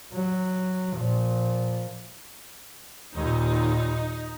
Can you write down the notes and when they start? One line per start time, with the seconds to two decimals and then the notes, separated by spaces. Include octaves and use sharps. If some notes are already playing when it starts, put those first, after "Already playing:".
0.13 F#3
0.96 A#2 F3
3.14 D#2 A#2 D#4